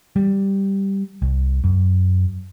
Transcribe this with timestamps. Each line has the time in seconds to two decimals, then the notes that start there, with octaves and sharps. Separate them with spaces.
0.16 G3
1.22 C2
1.64 F#2